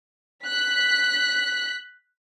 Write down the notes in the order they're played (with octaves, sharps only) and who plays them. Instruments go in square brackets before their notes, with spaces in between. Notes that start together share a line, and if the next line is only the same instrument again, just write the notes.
[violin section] F#6 B6